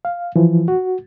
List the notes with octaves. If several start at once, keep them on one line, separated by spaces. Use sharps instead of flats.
F5
E3 F3
F#4